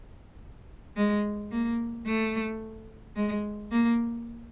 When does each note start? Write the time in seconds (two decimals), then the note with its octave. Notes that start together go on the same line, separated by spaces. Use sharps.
0.96 G#3
1.51 A#3
2.06 A3
3.16 G#3
3.71 A#3